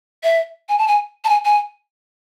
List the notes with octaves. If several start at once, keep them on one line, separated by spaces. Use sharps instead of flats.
E5
G#5
A5
G#5
A5
G#5
G#5